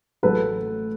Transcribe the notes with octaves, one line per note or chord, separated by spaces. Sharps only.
A1 A2 F#3 A3 A4 B4